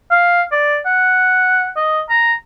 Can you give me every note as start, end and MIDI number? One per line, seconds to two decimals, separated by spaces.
0.11 0.43 77
0.52 0.78 74
0.86 1.71 78
1.76 2.01 75
2.10 2.33 82